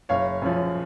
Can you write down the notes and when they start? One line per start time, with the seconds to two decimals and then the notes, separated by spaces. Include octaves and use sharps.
0.09 F#1 C#5 F5
0.42 F#2 F3